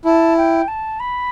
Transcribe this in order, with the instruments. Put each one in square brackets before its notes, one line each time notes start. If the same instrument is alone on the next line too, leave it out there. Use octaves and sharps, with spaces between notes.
[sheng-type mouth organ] E4 [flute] A5
[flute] G5
A5
B5